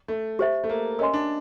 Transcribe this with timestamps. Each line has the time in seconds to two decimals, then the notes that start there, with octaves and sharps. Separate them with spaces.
0.08 A3
0.39 G4 C5 E5
0.64 A3
0.69 A#3
0.99 C#4 A#4 D#5 G#5 C6
1.14 D4